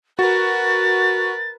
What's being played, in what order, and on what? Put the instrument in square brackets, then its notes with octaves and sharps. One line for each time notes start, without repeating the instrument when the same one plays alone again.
[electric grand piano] F#4 [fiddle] A#4 B4 [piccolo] A6